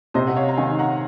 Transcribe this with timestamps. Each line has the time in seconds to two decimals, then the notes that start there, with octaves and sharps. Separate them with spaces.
0.14 C3 C5 D#5
0.27 F#5
0.36 C#5 F5
0.49 A#5
0.57 D#3 F5 G#5
0.79 F#5 A#5